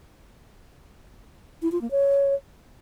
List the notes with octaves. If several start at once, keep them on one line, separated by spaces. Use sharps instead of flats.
E4
F4
A#3
C#5